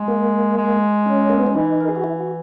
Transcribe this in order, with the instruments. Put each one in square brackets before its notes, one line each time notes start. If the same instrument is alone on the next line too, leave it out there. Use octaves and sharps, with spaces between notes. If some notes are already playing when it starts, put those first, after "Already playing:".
Already playing: [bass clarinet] G#3
[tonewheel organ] A#3
[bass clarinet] G#3
[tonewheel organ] C#4
A#3
B3
C#4
[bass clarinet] E3 [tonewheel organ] D#4
[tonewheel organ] A#4
G#4
F#4
E4
F#4